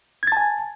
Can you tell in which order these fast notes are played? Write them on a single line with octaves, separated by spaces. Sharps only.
G#6 A6 A5 G#5